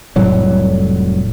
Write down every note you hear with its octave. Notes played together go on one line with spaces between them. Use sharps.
F1 A2 F#3 G3